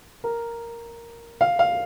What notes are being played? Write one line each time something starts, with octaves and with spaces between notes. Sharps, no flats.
A#4
F5
F5